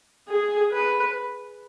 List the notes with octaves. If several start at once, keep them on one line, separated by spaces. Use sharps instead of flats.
G#4
B4